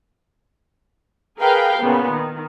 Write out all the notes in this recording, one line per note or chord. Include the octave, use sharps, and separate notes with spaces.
G#4 A#4 B4 F5 G5
A#2 C#3 B3
D#3